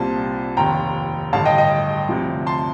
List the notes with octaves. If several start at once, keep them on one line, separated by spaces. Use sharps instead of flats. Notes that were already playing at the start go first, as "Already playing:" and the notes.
Already playing: C2 A#2 G3 C4 F4 A5 C6
F1 D#2 D#3 G5 A#5
A1 G2 D3 F5 A5
D#5 G5
D#5 G5
D2 C3 F3
A5 C6